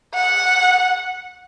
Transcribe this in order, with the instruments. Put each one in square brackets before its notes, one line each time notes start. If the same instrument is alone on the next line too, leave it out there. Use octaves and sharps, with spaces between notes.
[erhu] F#5